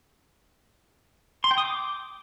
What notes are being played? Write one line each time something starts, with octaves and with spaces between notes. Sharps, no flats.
C6
G5
D#6
D6